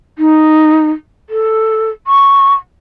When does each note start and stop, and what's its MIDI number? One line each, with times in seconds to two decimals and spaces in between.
0.18 0.90 63
1.30 1.90 69
2.07 2.54 85